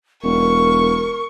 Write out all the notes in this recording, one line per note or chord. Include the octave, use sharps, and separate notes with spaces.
E1 A#4 C#6